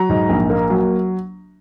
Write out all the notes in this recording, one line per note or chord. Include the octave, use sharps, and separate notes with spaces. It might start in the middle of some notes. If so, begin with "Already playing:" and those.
Already playing: F#3 A#5
G#2
A#1
A#3
F#3